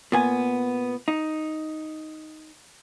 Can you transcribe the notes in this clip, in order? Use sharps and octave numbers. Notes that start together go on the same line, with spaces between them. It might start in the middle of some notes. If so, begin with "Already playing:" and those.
A#2 B3 G#5
D#4